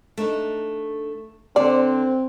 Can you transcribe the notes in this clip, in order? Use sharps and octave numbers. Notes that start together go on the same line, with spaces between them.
A3 D4 D#4
D3 C4 C5 D5